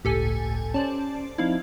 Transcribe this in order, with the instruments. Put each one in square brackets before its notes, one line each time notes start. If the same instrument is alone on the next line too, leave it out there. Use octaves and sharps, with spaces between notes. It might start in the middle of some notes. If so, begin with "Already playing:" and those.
[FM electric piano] G1 C#2 A2 [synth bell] G4 A4 G#5
[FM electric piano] C#4 [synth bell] C5 D5 A5
[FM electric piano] F3 C4 D#4 [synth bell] E4 F5